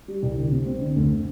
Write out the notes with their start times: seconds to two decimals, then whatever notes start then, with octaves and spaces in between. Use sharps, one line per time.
0.08 G3
0.23 C2
0.38 D3
0.52 C4
0.66 C4
0.81 D3
0.96 D2